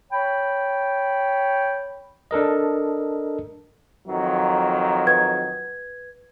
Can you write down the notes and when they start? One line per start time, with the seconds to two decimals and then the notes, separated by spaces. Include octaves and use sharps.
0.12 C#5 G5 B5
2.31 D4 A4 A#4 D#5
4.05 F2 D#3 F#3
5.06 B4 G#6